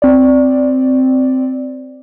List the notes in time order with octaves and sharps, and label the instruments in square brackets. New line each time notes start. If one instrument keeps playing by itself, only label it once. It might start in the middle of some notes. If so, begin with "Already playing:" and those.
[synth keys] C4 D5